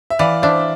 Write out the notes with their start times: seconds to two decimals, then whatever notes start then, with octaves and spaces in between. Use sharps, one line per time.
0.10 E5
0.19 E3 D5 F5
0.42 D4 C5 E5